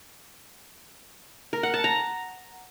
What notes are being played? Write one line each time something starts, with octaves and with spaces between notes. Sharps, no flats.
A#4
F#5
A5
A#5